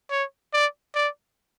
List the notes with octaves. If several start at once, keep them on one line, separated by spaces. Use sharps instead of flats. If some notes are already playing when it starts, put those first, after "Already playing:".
C#5
D5
D5